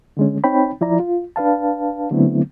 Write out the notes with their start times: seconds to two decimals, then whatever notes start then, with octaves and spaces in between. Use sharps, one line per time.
0.17 D3 G#3 C#4
0.44 C4 D#4 C#5 G5 B5
0.81 F3 E4 D5 A#5
1.00 F4
1.36 D4 B4 F5 A5
2.11 D3 F#3 A3 B3 C4 E4